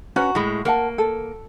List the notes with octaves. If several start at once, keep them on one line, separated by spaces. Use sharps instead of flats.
C#4 F#4 B4 A#5
A2 G#3 B5
A#3 A#4 F#5 A5
A4